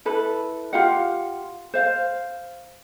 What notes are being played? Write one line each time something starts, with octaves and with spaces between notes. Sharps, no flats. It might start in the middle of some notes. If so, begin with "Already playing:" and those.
E4 A4 B4
F4 G4 F5 F#5
C5 F5